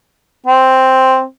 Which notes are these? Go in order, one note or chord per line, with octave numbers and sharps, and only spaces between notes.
C4